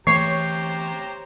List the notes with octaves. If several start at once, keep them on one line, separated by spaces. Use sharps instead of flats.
E3 A3 G4 C5 C#5 A#5 C7